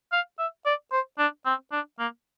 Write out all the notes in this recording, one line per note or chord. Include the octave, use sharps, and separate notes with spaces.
F5
E5
D5
C5
D4
C4
D4
A#3